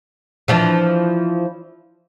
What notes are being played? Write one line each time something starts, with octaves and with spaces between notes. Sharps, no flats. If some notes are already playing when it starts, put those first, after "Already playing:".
E3 F3 D4